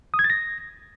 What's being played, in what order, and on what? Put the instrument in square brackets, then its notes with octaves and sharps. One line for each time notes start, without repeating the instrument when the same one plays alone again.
[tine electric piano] D#6
G#6
A6
A#6